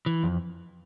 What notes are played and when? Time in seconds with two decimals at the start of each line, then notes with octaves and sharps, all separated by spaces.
0.06 E3
0.23 F2